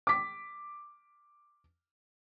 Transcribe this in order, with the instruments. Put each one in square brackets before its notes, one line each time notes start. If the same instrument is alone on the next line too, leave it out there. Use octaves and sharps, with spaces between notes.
[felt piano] D6 B6